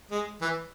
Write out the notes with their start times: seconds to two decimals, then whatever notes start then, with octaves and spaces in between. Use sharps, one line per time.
0.11 G#3
0.41 E3